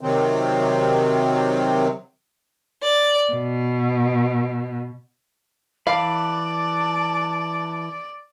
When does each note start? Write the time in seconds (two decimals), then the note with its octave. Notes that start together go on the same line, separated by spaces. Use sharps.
0.01 C3 D#3 F#3 C4
2.82 D5
3.33 B2
5.87 E3 D5 F5 A5 B5